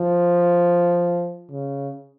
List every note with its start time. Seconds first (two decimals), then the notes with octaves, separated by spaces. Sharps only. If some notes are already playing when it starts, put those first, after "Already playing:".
Already playing: F3
1.51 C#3